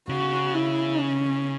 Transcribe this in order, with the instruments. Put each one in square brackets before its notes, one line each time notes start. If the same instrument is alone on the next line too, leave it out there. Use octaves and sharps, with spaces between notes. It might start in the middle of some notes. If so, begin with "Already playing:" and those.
[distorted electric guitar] C#3 [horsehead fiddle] F#4
[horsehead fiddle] E4
C#4